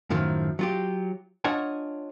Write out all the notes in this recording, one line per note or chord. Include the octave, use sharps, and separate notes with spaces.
F#2 A2 D#3 F3
F#3 F4 G4
D4 F4 C#5 D#5 F#5 G#5